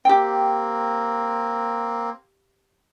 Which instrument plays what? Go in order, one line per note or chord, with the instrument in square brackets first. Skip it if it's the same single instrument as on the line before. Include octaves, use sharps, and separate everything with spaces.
[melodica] A#3 C4 [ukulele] G4 G5